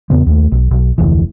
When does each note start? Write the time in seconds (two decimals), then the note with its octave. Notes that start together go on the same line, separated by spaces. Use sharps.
0.10 E2 C#3 B3 C4
0.26 D#2 A3
0.52 B1
0.71 B1
0.98 F1 D2 E3